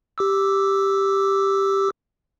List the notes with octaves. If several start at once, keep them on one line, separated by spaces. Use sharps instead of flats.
G4 D6 E6